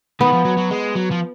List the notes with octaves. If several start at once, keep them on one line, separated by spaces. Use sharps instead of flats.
D#3 B3
F3
F#3
F#3
G#3
F#3
F3